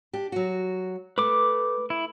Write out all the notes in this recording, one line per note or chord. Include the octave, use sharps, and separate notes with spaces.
D4 G4
F#3 F#4
A3 B4 D6
E4